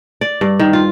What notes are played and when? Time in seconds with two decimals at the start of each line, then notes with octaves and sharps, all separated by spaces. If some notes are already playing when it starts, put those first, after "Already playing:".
0.21 D5
0.41 G2
0.59 D#3
0.73 F4